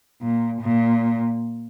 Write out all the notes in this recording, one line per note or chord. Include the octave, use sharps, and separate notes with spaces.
A#2
A#2